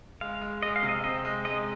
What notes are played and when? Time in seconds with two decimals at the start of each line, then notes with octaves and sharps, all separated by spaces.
0.21 G#3 F5
0.42 G#3
0.63 G#3 D#5
0.76 F5
0.83 C3
0.89 D#5
1.04 C4 D#5
1.25 G#3
1.45 G#3 D#5